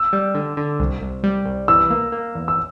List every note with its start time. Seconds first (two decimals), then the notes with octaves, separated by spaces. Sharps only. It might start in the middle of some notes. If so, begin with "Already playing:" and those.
Already playing: E6
0.13 G3
0.35 D3
0.57 D3
0.79 C2
1.02 C2
1.23 G3
1.45 C2
1.68 E3 E6
1.90 A#3
2.12 A#3
2.35 E2
2.48 E6